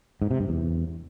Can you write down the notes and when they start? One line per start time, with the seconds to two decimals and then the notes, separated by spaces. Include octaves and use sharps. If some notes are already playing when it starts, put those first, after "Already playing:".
0.22 G#2
0.31 C3
0.40 G2
0.49 E2